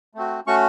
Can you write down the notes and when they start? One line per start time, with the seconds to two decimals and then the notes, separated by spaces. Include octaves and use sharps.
0.15 A3 C4 F#4
0.47 A3 C#4 F#4 C#6